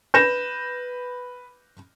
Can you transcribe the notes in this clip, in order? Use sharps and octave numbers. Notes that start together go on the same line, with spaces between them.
B4 G6 A#6 E7